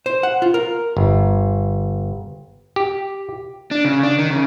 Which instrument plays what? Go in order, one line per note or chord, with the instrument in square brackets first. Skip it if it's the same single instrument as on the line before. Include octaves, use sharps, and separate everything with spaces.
[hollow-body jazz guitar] C5
F#5
F4
A#4
[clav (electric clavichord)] G1
G4
[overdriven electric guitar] D4
C#3
D4
D#3
C#3